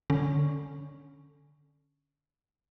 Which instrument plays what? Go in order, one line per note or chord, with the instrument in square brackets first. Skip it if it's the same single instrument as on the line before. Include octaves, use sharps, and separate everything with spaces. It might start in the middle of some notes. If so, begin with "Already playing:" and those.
[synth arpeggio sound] D3 C#4